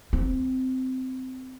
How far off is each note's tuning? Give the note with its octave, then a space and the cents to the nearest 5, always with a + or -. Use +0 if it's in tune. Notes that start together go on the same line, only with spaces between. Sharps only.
C4 -15